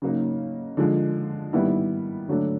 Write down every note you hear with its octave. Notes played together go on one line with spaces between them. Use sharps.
C#3 F#3 A#3 D#4
D3 F3 G#3
D#3 G3 B3 E4
D3 F#3 A3 D4